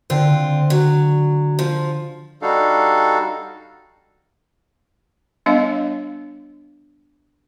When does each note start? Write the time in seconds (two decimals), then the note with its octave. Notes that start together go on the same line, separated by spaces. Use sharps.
0.10 D3 C4 F4
0.70 F#3
1.59 F3
2.42 G3 D4 D#4 F#4 A4 F5
5.46 G3 B3 D4 C#5 D#5 F5